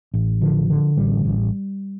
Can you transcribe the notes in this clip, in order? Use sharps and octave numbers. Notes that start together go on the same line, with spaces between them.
A1
D3 F3
D3
A1 G3
A1